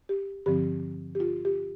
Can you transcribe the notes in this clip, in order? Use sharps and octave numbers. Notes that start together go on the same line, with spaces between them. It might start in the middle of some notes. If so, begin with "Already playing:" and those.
G4
G2 D3 F3 C4 G4
G4
F4
G4